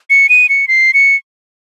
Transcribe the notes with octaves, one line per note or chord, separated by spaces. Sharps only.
C#7
D#7
C#7
C7
C#7